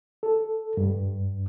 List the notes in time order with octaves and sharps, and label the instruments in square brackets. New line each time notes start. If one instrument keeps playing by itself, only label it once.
[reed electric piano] A4
G2